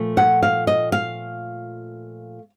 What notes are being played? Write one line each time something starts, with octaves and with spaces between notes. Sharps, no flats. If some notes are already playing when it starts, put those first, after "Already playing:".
Already playing: A#2 F3 A3
F#5
F5
D#5
F5